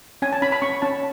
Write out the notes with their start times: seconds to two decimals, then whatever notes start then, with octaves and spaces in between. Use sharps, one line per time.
0.22 C#4 G#5
0.33 A5
0.42 C#4 B5
0.52 B5
0.62 C#4 C#6
0.82 C#4 A5